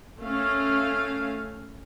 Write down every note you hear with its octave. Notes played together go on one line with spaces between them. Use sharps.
A3 C#4 F5